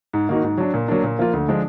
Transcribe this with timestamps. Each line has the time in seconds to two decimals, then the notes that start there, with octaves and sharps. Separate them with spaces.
0.13 G#2
0.29 D#3 A#3 D#4 F#4
0.43 G#2
0.58 F#3 D4
0.74 A#2
0.88 F#3 A#3 D4
1.03 A#2
1.19 F3 A#3 F4
1.33 D2
1.48 D3 F3 G#3 D4